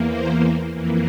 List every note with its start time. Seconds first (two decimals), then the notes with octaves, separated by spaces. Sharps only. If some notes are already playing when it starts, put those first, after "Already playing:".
Already playing: E2 E3 A#3
0.09 C5
0.73 F2 E3 A#3